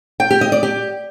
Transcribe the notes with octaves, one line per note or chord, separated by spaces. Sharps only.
G5
G4
D#5
D5
G4